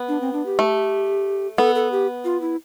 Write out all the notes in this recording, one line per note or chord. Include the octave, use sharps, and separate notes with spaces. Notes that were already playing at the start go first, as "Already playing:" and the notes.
Already playing: B3
D4
C4
D4
G4
A3
B3 A4
A4
G4
F4
E4